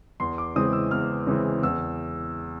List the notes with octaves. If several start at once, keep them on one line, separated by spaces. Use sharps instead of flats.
E2 C6
D6
C#3 E3 G#3 C4 D#6
E6
E2 F6
C#3 E3 G#3 C4
E2 E6